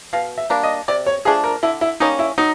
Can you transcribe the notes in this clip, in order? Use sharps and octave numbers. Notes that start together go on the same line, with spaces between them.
B2 F5
E5
G3 A#3 D4
D#5
C3 D5
C#5
F3 A3 D4 G#4
A#4
D3 E4
E4
G3 A#3 C#4 D#4
E4
F#3 D#4